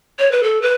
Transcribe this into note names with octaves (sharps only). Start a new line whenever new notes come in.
C#5
B4
A4
B4